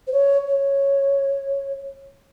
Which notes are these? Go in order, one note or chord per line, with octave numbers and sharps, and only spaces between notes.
C5
C#5
C#5